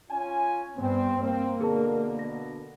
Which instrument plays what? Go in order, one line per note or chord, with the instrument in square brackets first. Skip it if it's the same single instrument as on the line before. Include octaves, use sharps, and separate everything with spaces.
[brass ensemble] C#4 F4 G#5
[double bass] G2 B3 [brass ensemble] C4
[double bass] A#3 [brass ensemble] C4
[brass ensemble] B2 D3 [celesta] G#4 A#4 A5
[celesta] A#6